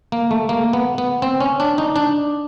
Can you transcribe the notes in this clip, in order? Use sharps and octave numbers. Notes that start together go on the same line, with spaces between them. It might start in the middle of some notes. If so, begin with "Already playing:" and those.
A#3
A3
A#3
B3
B3
C4
C#4
D4
D#4
D4